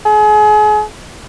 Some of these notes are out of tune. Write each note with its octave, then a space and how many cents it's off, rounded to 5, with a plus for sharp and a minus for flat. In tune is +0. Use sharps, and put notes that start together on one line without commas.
G#4 +35